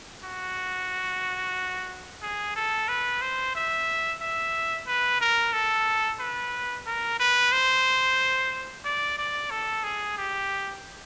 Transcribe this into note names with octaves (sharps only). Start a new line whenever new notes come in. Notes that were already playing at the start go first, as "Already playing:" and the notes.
F#4
G#4
A4
B4
C5
E5
E5
B4
A#4
A4
B4
A#4
B4
C5
D5
D5
A4
G#4
G4